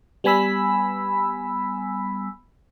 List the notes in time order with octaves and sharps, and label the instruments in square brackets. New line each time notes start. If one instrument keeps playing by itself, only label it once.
[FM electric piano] G3 B3 G#5 B5 E6 B6